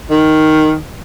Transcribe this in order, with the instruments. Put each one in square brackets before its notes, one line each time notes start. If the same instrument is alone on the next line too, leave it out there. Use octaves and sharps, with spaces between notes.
[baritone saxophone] D#3